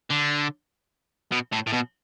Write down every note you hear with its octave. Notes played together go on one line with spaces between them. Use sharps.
D3
B2
A2
A2
B2